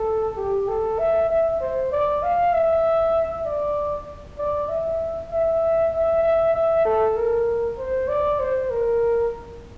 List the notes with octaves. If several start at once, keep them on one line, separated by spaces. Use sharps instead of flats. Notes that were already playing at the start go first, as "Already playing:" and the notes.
Already playing: A4
G4
A4
E5
E5
C5
D5
F5
E5
D5
D5
E5
E5
E5
E5
E5
A4
A#4
C5
D5
C5
A#4